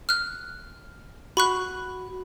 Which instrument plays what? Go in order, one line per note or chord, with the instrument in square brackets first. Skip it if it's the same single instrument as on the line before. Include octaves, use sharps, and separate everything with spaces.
[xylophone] F6 F#6
[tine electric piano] F#4 [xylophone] B5 C#6 F#6